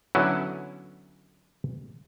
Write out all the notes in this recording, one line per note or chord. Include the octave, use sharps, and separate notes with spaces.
D3 F#3 B3 C#4 E4